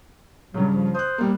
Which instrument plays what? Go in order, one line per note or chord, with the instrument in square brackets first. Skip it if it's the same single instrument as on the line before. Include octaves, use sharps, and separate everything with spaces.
[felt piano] G2 C#3 [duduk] F#3
[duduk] F3
[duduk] C5 [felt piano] D#6 F#6
[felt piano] G3 A#3